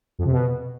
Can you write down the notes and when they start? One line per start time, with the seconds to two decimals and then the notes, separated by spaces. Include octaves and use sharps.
0.19 F2
0.25 C3
0.32 B2